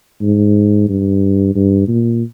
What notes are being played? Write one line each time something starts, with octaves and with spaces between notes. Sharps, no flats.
G#2
G2
G2
A#2